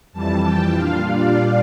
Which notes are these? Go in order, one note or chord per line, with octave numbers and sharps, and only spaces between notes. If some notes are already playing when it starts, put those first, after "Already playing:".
F2 E3 G3 A5
G5
A#2 G3 D4 F4 F5
D5